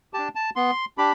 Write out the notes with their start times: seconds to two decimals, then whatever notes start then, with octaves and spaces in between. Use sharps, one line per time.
0.13 D4 G4 A5
0.35 A5
0.56 B3 C6
0.98 D4 G4 B5